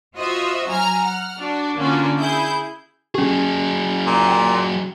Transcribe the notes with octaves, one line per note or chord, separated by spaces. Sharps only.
F4 F#4 C5 D#5 E5
F#3 G#5 A#5 F6
F#5 F6
D4 F#4
D3 A#3 C#4 D4 F4 F#4
E4 G#4 G6
F#3 C#4 G4 G#4
A#2
G5